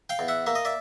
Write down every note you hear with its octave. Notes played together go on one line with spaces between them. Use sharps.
F5 G5
E2
E5 F#5
A#3 E5
D#5
D5 E5